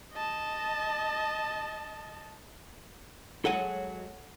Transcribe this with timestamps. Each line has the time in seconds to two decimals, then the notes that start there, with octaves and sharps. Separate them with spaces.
0.14 D#5 A5
3.45 F#3 G#3 A4 F#5 G#5